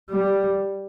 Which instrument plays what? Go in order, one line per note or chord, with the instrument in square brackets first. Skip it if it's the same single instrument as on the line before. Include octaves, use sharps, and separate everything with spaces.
[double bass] G3